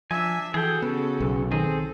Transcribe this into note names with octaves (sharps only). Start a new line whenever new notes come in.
F3 D4 E5 G#5
E3 F#4 G#4 A4 G5
C#3 B3
B1
D#3 C4 G#4 A4